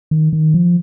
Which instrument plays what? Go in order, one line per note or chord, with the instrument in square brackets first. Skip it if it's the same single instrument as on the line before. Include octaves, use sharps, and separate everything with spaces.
[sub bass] D#3
D#3
F3